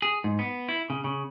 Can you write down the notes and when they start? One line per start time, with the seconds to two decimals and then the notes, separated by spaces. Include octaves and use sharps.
0.02 G#4
0.24 G#2
0.39 B3
0.69 E4
0.90 C#3
1.04 C#3